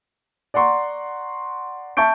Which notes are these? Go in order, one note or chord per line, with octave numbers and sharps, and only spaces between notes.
D5 F#5 A#5 C6 C#6
E5 A5 C#6 G6 D7